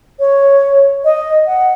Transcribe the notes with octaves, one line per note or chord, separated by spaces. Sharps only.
C#5
D#5
F#5